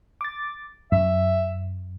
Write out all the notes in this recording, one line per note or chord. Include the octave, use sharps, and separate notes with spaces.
D6 A6
F#2 E5